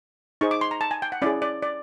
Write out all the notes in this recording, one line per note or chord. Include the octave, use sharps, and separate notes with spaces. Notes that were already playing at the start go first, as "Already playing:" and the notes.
D#4 G#4 C5 C#6
D6
C6
A#5
A5
G#5
G5
F#5
C#4 E4 G#4 D5
D5
D5